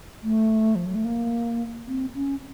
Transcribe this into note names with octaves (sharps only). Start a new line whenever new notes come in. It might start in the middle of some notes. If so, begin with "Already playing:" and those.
A3
F3
F#3
A3
A#3
C4
C#4